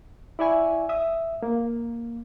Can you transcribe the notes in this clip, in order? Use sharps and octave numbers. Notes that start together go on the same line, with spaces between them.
E4 D5 E5 G#5 C#6
E5 D#6
A#3